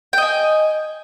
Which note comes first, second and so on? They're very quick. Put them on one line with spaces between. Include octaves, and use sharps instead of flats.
G5 D#5 G#5